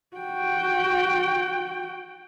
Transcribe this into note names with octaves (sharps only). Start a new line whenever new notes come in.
F#4 G5